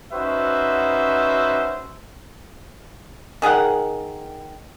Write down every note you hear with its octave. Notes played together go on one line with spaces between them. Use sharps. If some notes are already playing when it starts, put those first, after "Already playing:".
C#4 D#4 F#4 B4 C5 E5
D#3 G#4 A#4 F#5